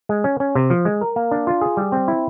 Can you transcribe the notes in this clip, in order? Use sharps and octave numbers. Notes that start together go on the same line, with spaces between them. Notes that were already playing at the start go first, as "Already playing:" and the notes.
G#3
C#4
C#4
C3
F3
G#3
A#4
A#3
D4
F4
G#4
G3
C4
E4